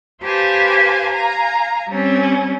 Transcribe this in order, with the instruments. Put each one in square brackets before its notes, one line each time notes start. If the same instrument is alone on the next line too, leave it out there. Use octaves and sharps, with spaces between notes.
[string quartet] G4 B4 C5 F5 G#5 A5
F5 G#5 A#5
G3 C4 C#4